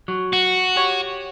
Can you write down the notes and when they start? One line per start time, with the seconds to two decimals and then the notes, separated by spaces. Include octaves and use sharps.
0.08 F#3
0.33 F#4
0.76 G4 C#5